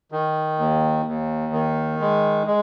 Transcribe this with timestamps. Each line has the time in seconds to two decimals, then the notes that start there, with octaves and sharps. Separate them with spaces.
0.12 D#3
0.59 D#2
1.06 D#2
1.53 D#3
2.00 G#3
2.47 G#3